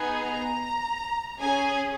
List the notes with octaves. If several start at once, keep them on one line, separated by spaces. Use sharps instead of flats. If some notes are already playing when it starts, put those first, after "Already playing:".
Already playing: B3 D#4 G#4
A#5
C#4 G#4 G#5